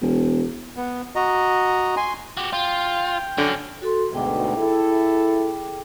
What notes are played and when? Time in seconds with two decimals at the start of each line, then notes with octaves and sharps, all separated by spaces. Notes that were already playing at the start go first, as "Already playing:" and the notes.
0.01 E1
0.77 B3
1.16 F#4 D#5 A#5
1.97 G#5 C6
2.37 F#4 G4
2.53 F4 G5
3.38 D3 C#4 F#4
3.82 F#4 A4 C6
4.12 D2 G#2 B2 G#4 G5 D6
4.57 E4 A4